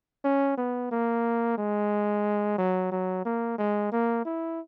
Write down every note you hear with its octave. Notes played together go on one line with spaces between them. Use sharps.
C#4
B3
A#3
G#3
F#3
F#3
A#3
G#3
A#3
E4